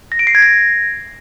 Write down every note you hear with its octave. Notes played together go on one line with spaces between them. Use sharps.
A#6
D7
C7
G#6
A#6